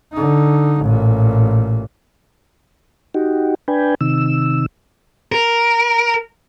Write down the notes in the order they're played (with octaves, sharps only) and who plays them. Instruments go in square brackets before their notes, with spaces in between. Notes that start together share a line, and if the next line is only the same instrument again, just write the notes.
[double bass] D3 D#4
A1 A#2
[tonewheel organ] D#4 F#4 G4
D4 B4 G5 G#5
C3 D#3 E6
[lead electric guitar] A#4